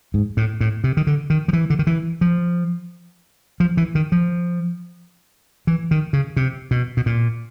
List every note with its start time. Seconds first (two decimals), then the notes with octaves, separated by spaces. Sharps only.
0.14 G#2
0.37 A2
0.61 A2
0.84 C3
0.97 D#3
1.07 D3
1.30 D#3
1.48 F3
1.53 E3
1.70 D3
1.79 D#3
1.87 E3
2.21 F3
3.60 F3
3.77 E3
3.95 D#3
4.12 F3
5.67 E3
5.91 D#3
6.13 C#3
6.37 C3
6.71 B2
6.97 B2
7.06 A#2